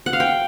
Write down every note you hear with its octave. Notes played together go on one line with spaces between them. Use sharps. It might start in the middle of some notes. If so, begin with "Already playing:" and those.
F#5
F5
G5